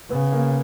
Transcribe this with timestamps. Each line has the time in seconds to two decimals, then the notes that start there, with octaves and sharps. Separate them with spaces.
0.10 C#3 B3
0.32 A#3